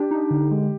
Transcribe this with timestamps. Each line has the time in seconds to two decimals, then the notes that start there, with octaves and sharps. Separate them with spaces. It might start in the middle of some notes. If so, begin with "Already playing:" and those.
Already playing: D4 G4
0.11 D#4
0.30 D3
0.51 G#3